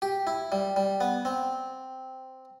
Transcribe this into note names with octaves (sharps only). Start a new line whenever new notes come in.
G4
E4
G3
G3
B3
C4